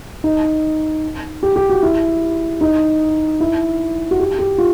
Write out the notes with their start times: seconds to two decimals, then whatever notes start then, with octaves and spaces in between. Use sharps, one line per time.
0.24 D#4
1.43 G4
1.56 G4
1.69 F#4
1.83 E4
2.61 D#4
3.40 E4
4.11 F#4
4.19 G4
4.39 G4
4.58 F4